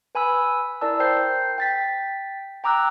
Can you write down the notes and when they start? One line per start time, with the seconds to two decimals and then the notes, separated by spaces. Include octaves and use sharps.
0.15 B4 G#5 B5 E6
0.81 E4 A#4 D5 A5 E6
0.99 A#4 C5 G5 G6 C7
1.58 G5 A6 B6
2.64 G5 A#5 D6 E6 F#6